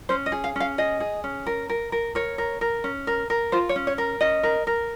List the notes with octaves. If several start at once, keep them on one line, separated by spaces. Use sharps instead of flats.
C#4 C5
D#5
G#4
F5
C#4 F5
G#4 D#5
G#4
C#4
A#4
A#4
A#4
A#4 C#5
A#4
A#4
C#4
A#4
A#4
F4 C5
C#5
C#4
C#5
A#4
C#4 D#5
A#4
A#4